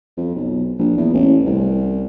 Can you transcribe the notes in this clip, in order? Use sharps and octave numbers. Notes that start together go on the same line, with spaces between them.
F2
B1
A#1
E2
A1
C2